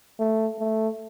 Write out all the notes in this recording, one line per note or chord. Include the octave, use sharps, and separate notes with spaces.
A3
A3